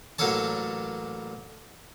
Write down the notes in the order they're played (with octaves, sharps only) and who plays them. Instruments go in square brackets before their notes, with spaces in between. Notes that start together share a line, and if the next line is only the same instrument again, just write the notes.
[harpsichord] A1 F#3 A#3 A4 C#5 A5